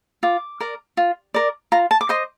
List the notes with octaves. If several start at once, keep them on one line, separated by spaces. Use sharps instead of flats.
F4 D6
A#4 D5
F4
A#4 D5
F4 A#5
A5
D6
C5 D#5 C6